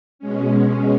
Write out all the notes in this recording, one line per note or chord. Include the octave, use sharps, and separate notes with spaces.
B2 G#3 C#4